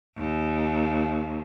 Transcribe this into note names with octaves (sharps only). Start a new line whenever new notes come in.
D#2